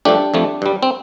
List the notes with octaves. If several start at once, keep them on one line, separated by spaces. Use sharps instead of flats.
G2 F3 A3 D4 G4
F2 F3 A3
G2 G3
C4